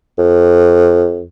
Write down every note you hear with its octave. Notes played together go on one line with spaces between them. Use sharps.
F2